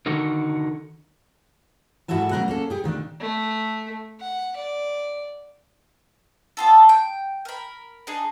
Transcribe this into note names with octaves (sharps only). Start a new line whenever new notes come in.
D3 D#3 D#4 F#4 A4 A#4
G#2 E4 F#4 A4 E5 A5
C#3 F#3 A3 A#4 D#5 F#5
A#3 C#4 A4
G4 G#4
A#2 D#3 A3 D4
A3
F#5
D5
B3 F4 A4
G5
A#4 B5
D4 D#4 G#4